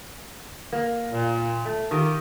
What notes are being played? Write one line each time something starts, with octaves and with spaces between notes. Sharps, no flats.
A#3
A#2
A3
D#3 F4 G4 A#4